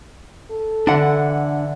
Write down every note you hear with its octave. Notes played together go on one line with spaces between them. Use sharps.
A4
D3 E3 D4 F#5